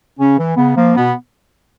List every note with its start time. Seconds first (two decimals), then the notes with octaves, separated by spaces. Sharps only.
0.20 C#3 C#4
0.38 E3
0.57 C#3 B3
0.76 F3 A#3
0.95 B2 B3